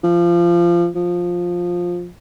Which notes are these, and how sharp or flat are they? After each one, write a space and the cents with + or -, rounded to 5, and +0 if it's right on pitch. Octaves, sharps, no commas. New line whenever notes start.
F3 -20
F3 +10